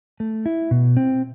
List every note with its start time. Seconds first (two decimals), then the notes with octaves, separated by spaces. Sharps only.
0.20 A3
0.46 E4
0.71 B2
0.97 C4